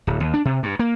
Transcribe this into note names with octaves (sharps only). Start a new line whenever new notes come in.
D1
D#2
D4
C3
G2
A#3